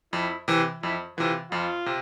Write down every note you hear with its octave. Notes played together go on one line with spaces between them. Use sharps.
F2 E4
C3 E3
F2 E4
C3 E3 F4
F2 F4
C3